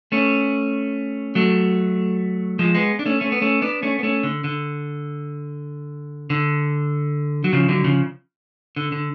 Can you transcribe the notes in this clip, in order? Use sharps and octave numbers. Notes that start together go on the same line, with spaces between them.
A3 C#4
F#3 A3
F3 G#3
G#3 B3
D4
A3 C#4
A3 C#4
B3
A3 C#4
B3 D4
A3 C#4
B3
A3 C#4
D3
D3
D3
F#3
C#3 F3
D3 F#3
C#3 F3
D3
D3